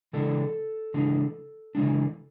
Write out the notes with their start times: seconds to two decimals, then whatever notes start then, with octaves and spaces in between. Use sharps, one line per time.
0.13 C#3 E3 G#3 D4 A4
0.94 C#3 E3 G#3 D4
1.75 C#3 E3 G#3 D4